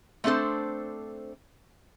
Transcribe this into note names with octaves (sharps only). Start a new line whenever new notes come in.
A3 C4 D4 A4 C5